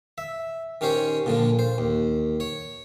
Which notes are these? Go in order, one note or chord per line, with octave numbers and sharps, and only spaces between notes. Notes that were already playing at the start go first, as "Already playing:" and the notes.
E5
D#3 C#4 G4 C5 C#5
A#2 D3 F3
C5
D#2
C#5